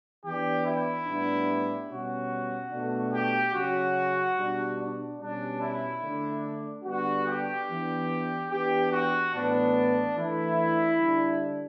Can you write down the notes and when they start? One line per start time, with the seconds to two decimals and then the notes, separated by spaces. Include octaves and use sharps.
0.24 E3 B3 D4 G4
0.65 E4
1.06 A2 G3 B3 D4
1.89 B2 G3 C#4 F#4
2.71 B2 A3 D4
3.12 G4
3.54 C#3 F#3 C#4 F#4
4.37 B2 G3 D4
4.78 D4
5.19 B2 G3 C#4 D4
5.61 E4
6.02 D3 A3 D4
6.84 D3 G3 B3 D4 F#4
7.27 G4
7.68 E3 B3 D4
8.50 E3 B3 D4 G4
8.91 F#4
9.33 A2 E3 B3 D4
10.16 E3 A3 D4 E4
10.98 D3 G3 D4